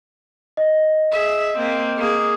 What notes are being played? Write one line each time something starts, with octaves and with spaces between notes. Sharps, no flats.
D#5
G#4 E5
A#3 C4
A#3 G#4